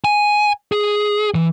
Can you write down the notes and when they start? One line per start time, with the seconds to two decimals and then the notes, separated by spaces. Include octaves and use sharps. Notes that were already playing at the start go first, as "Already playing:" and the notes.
0.05 G#5
0.72 G#4
1.35 E3